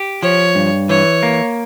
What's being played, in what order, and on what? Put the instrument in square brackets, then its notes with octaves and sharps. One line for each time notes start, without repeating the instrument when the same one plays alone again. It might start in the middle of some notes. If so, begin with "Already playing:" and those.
Already playing: [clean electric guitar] G4
[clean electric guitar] F3 [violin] C#5
[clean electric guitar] G2
[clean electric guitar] E3 [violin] C#5
[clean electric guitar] A#3